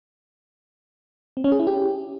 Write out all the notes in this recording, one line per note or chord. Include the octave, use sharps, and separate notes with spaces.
C4
C#4
G#4
E4
G4